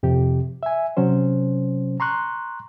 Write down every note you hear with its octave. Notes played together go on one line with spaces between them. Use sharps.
F2 C3 G4
E5 G#5
C3 F#3 C#4 C5
A#5 C6 C#6 F#6